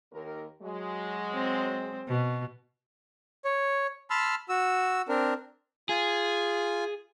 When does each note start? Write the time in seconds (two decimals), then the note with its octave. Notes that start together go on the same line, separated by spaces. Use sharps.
0.12 D#2 A#4
0.62 F#3 G#3
1.34 C4
2.08 B2
3.45 C#5
4.10 A5 B5 C6 E6 F6
4.49 F#4 E6
5.08 C4 D4 A#4
5.89 F4 G#4 G#5